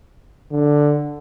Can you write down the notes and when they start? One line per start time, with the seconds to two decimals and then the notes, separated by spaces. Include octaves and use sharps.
0.52 D3